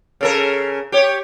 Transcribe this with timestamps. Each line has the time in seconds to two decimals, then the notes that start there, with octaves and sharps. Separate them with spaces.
0.21 C#3 A4 A#4
0.92 G4 C#5